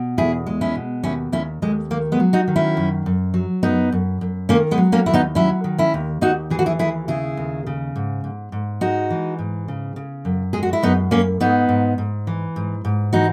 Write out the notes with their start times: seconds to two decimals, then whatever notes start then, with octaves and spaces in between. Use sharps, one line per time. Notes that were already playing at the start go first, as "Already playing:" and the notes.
Already playing: B2
0.17 E2 E4 G#4
0.46 G#3
0.61 C#4 E4
0.75 B2
1.03 D#2 C#4 E4
1.32 D#2 C#4 E4
1.62 D#2 G#3
1.90 D#3 A#3
2.12 G#3 B3
2.20 F#3
2.33 D#4 F#4
2.48 D#3
2.56 C#4 E4
2.77 F#2
3.06 F#2
3.34 F#3
3.63 F#2 B3 D#4
3.92 F#2
4.21 F#2
4.49 D#3 A#3 C#4
4.71 G#3 B3
4.78 F#3
4.92 A#3 C#4
5.06 D#2 E4
5.14 B3 D#4
5.35 F#3 C#4 E4
5.64 D#3
5.78 C#4 E4
5.94 D#2
6.21 D#2 D#4 F#4
6.50 E3 G#4
6.59 F#4
6.66 E4 G#4
6.79 D#2 E4 G#4
7.08 C#3 E4 G#4
7.37 D#2
7.66 C#3
7.96 G#2
8.24 G#2
8.52 G#2
8.81 G#3 D#4 F#4
9.10 E3
9.39 G#2
9.68 C#3
9.96 C#3
10.25 F#2
10.53 G#3 G#4
10.63 F#4
10.73 E4
10.83 F#2 B3 D#4
11.11 F#2 A#3 C#4
11.40 G#2 B3 D#4
11.69 G#2
11.98 G#2
12.27 E3
12.56 G#2
12.85 G#2
13.13 E3 D#4 F#4